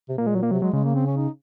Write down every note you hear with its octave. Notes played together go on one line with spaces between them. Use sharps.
C3
A#2 A#3
G#3
F#3
A#3
C3 F#3
F#3 G#3
C#3 G#3
A#3
C4
C#4
D#4